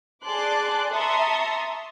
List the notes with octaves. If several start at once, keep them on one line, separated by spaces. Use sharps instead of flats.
G#4 D5 A5 C6 D6 F#6
E5 A5 A#5 C6 C#6 D#6